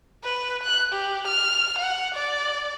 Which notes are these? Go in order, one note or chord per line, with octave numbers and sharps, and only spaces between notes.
B4
F#6
G4
F6
F#5
D5